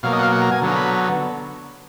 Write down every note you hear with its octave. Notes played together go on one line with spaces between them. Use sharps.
B2 F#3 A#3 F5
D#5
F#5
F5
F#5
A#5
G#5
D3 F#3 B3
A#5
B5
A#5